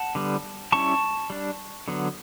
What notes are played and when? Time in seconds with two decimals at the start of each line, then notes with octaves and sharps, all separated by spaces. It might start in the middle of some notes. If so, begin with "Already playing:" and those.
Already playing: F#5 A5
0.15 D3 G3 B3
0.72 G3 C#4 E4 A5 C#6
1.30 G3 D4
1.88 D3 F#3 B3